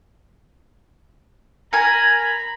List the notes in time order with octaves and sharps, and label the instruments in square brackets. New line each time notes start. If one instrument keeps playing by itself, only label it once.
[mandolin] A#4 G#5 [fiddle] A#5 B5